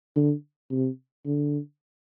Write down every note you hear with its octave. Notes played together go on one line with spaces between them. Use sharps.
D3
C3
D3